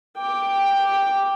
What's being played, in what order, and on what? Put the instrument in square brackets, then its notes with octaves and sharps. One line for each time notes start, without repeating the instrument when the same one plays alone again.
[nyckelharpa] G5 D6